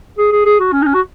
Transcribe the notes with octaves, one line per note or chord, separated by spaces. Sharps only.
G#4
G#4
G#4
F#4
C#4
D#4
C#4
F#4